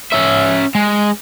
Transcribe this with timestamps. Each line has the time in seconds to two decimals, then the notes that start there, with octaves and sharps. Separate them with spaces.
0.12 C#4 E5
0.75 G#3